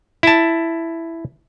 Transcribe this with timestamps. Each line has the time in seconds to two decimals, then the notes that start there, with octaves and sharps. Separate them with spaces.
0.23 E4 A5